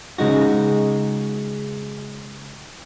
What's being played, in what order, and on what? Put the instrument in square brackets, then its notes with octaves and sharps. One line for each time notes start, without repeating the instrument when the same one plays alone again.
[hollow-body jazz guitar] C#3 G#3 D#4 F#4